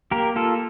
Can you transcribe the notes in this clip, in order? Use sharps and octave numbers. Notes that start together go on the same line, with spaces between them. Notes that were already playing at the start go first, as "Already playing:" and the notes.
A#3 G4 A#4
A#3 F4 A4